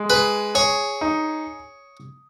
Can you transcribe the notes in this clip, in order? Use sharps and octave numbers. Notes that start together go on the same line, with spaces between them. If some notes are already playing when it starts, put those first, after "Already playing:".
Already playing: G#3
G#4 B4
G#4 C#5
D#4